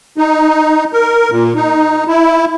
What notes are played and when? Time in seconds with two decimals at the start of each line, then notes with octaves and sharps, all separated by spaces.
0.18 D#4
0.93 A#4
1.30 A#2
1.56 D#4
2.07 E4